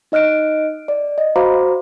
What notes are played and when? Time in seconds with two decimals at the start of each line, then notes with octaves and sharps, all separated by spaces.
0.12 D#4 D#5 F6 F#6 D7
0.88 D5
1.18 D#5
1.36 F#4 C5 F5 A#5 B5 D6